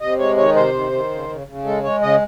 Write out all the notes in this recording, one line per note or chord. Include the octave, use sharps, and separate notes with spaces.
C3 D#5
G#3 C#5
D#3 C#5
C3 C5
D#3
D#3
C#3
C#3
C#3
G#3 A4
G#3 C#5
C#3 D#5